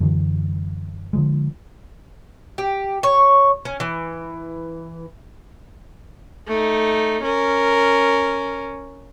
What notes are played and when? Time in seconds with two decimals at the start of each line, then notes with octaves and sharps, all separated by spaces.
0.01 F#2 D3 E3 F#3
1.13 D3 F3 G#3
2.58 G4
3.03 C#5
3.65 C#4
3.80 E3
6.47 A3 D#4
7.23 C#4 A#4